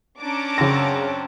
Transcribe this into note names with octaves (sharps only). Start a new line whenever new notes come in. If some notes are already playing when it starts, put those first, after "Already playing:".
C#4 D4 A5 A#5 D6
F#2 C#3 C4 A#6